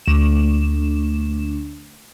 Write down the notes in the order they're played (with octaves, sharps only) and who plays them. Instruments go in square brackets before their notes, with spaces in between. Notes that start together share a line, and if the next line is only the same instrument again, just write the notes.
[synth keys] D2 E7